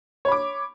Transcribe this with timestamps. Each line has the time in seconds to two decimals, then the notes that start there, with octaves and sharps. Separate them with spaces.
0.25 C#5
0.28 B5
0.32 D6